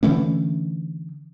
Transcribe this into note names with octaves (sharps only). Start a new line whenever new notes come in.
D3 E3 A3 C#4